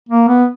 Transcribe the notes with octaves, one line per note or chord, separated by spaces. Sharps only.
A#3
B3